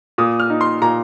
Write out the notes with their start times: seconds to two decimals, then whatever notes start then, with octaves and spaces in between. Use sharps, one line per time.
0.18 A#2 D#6
0.40 F6
0.50 D#4
0.61 C6
0.82 A#2 A#5